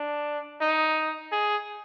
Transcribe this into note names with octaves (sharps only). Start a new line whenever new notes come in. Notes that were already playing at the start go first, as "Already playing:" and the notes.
Already playing: D4
D#4
G#4